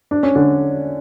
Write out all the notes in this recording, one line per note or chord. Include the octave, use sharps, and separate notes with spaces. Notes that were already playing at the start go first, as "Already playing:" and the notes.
D4
C#4
D3 D4